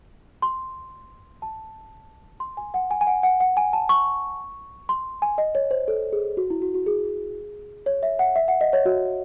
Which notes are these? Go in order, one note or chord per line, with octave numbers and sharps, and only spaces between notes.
C6
A5
C6
G#5
F#5
G#5
G#5
F#5
F#5
F#5
G#5
A5
C#6
C6
G#5
D#5
C#5
C5
A4
G#4
F#4
E4
F#4
F#4
G#4
C#5
E5
F#5
E5
F#5
D#5
C#5
F#4